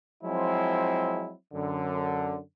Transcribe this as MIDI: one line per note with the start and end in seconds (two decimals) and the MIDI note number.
0.24 1.33 53
0.24 1.33 54
0.24 1.33 56
0.24 1.33 60
0.24 1.33 64
1.54 2.39 42
1.54 2.39 50